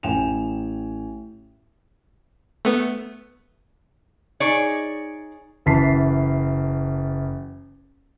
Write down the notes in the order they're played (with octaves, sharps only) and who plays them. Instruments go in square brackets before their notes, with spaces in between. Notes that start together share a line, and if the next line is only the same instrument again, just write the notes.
[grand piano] A1 G5 G#5 E7 F7
[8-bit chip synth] A3 B3
[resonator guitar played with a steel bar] D#4 G#4 C#5 D5
[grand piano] F#1 E3 A5 B6 C7